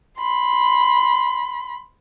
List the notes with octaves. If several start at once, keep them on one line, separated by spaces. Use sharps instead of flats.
B5 C6